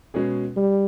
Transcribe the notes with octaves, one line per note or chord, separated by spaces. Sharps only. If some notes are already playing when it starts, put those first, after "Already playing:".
B2 G#3 C#4 G#4
G3